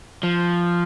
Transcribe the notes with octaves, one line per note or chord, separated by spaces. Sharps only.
F3